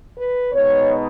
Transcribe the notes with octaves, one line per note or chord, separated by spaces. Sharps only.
B4
B2 G#3 B3 D#4 C#5